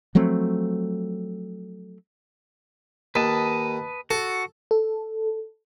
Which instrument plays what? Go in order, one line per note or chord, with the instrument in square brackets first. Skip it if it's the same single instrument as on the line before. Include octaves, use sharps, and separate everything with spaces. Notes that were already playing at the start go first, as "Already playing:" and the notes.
[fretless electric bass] F3 F#3 A3 C4
[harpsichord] D#2 [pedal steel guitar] B4 D#5 A5
[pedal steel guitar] F#4 [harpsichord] A4
[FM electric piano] A4